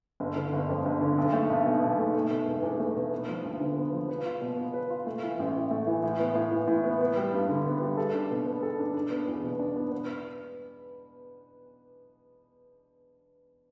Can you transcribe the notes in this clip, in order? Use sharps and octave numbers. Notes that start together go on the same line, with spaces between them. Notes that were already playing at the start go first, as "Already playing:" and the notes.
G1
D3
G1
F2
G1
D3
B1
A3
B1
B2
B1
A3
A3
B2
E1
E2
A3
B2
B3
F3
D2
D3
B3
F3
B4
F4
B2
B3
B4
F4
A3
E3
A1
A2
A3
E3
A2
B3
A2
E3
A2
B3
B3
G3
G2
D3
B3
G3
A4
D4
B2
B3
A4
D4
D4
B3
E2
B2
D4
B3
B3